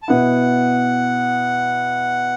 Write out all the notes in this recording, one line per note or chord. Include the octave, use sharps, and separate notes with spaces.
A5
B2 B3 E4 F#5